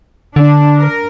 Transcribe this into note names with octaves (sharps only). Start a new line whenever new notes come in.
D3 D4
A#4